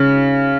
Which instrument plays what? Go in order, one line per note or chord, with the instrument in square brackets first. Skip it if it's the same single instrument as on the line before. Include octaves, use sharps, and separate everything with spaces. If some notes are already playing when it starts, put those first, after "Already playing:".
Already playing: [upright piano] C#3